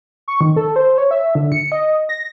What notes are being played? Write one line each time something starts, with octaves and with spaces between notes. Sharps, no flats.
C#6
D#3
A4
C5
C#5
E5
D3
C#7
D#5
A#6